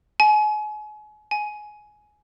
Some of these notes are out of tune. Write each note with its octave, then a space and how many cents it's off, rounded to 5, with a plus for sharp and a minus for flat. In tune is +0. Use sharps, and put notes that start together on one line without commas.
G#5 +35
G#5 +15